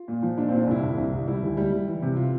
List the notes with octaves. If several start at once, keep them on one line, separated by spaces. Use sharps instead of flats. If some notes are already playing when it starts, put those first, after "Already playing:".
Already playing: F4
A#2
F3
A#2 D4
A#2 C4
D4
C2 E4
C2
C2
C2
G3 E4
D2
G3
G3
E3
C3
F4